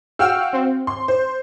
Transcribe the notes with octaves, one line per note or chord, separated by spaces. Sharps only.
F#4 F5 G5 E6 F6
C4
C6
C5